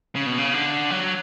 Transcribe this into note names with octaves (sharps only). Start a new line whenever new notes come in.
C#3
B2
C#3
D3
F#3